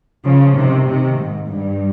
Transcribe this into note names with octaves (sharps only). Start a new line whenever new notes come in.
C#3 F3
C3 D#3
C3 D#3
G#2
G2